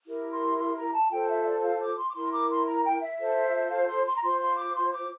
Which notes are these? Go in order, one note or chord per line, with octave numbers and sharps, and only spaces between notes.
E4 G4 A#4
C6
C6
A#5
A5
F4 A4 C5 G5
E5
D5
F5
D6
C6
D6
E4 A#4 C6
D6
C6
A#5
G5
E5
F4 A4 C5
F5
C6
C6
A#5
F4 C5 C6
C6
D6
C6
D6